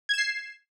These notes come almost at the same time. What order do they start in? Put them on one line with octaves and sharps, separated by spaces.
G#6 E7 C7